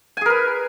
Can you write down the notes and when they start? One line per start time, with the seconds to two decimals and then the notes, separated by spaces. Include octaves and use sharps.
0.17 G#5
0.21 G#4
0.26 A#4
0.30 B4